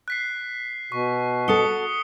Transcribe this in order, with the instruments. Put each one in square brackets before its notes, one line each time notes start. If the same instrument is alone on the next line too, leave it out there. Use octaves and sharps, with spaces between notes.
[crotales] F#6 B6 C7
[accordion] B2 [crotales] C#6
[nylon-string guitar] F#4 A4 [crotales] D#6 C#7 G7